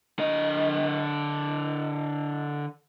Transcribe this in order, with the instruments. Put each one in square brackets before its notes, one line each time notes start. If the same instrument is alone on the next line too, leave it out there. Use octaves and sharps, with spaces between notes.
[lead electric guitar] D3 D#5